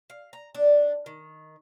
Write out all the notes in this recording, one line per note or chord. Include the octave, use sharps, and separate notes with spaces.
F5
A#5
D4
D#3